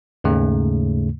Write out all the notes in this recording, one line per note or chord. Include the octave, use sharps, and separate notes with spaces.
D#2 G#2 C#3 A3